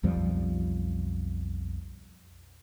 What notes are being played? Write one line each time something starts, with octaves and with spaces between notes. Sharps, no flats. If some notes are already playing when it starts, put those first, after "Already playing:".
B1 F2 F3 G3